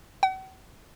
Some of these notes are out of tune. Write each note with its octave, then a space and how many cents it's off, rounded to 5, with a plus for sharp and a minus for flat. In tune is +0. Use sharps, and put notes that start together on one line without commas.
F#5 +45